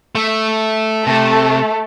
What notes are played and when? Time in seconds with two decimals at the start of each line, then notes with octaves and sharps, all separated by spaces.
0.15 A3 E5
1.06 C3 A3 A4